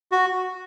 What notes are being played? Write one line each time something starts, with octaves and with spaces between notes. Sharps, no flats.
F#4